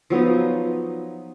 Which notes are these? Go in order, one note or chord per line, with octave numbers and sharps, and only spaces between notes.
F3 F#3 B3 D#4